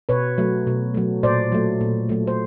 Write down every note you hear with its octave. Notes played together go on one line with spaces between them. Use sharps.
B2 B4 C#5
F#3 A3
B2
F#3 A3
A#2 C5 D5
F#3 A3
A#2
F#3 A3
C5